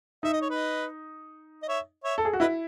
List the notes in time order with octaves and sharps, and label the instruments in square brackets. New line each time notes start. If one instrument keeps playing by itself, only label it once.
[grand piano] D#4 [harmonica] E5
[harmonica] D#5
C#5
B4 D#5
D#5
C#5 E5
C#5 E5
[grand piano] A4
G#4
F#4
[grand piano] E4 [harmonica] B4 D#5